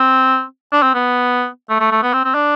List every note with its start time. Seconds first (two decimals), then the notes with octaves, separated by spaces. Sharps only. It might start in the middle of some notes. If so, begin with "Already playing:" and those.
Already playing: C4
0.72 D4
0.82 C4
0.94 B3
1.69 A3
1.80 A3
1.91 A3
2.02 B3
2.13 C4
2.25 C4
2.34 D4